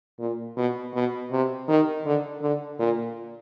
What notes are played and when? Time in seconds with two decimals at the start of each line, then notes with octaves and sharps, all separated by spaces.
0.19 A#2
0.57 B2
0.94 B2
1.31 C3
1.68 D#3
2.06 D3
2.42 D3
2.79 A#2